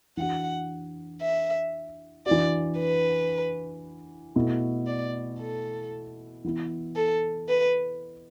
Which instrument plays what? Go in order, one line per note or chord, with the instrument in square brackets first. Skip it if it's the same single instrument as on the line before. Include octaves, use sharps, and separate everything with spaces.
[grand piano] E3 D4 F#4 [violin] F#5
[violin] E5
[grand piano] E3 D4 F#4 [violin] D5
[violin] B4
[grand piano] B2 A3 E4
[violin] D5
A4
[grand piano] E3 B3 E4
[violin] A4
B4